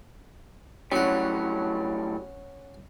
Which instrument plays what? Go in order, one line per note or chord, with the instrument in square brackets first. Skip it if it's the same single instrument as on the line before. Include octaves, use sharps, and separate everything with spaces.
[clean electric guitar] A2 F#3 G3 [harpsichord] C#4 F#5